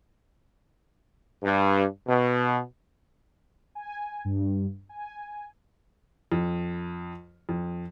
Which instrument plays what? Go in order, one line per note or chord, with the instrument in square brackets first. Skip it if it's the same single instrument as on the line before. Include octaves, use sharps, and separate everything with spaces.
[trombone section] G2
B2
[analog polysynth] G#5
G2
G#5
[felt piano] F2
F2